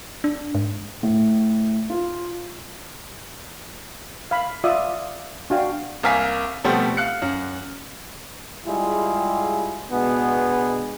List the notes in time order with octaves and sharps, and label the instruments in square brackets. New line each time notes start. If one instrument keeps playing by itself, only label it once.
[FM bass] D4
G#2
[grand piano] A2
F4
[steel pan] F5 B5
F4 D5 E5 D#6
D4 F#4 F5 G5
[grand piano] C2 A#3 A#4 F5 G#5 B6
B2 F3 G3 A3 B3 C4
F5 F#6 C#7
F#2
[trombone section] G3 G#3 E4 F4 G4 G#4
B2 G#3 B3 D4 F#4 G#4